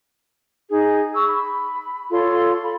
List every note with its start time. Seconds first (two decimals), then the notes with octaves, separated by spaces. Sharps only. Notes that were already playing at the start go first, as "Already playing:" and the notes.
0.69 D#4 G#4
1.14 C#6 E6
1.27 B5
2.11 F4 A4 C#5 C6
2.62 B5